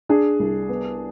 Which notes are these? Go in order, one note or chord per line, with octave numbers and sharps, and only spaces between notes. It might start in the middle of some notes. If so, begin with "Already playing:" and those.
D4 G#4
C2
B3